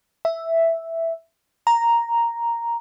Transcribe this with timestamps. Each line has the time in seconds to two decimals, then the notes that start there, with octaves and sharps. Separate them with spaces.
0.25 E5
1.67 A#5